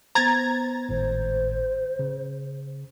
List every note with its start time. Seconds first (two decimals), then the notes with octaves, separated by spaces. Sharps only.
0.15 B3 C5 A#5 G#6 A6
0.89 G#1 A2 C5
1.99 C#3